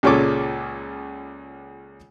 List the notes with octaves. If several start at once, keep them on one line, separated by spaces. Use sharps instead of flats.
C#2 A#2 G#3 C#4 A4 D6